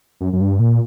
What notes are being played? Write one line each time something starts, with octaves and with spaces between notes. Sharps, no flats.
F#2
F#2
G2
A#2